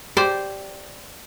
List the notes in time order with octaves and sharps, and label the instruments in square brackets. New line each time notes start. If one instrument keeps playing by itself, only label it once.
[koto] G4 C5 D5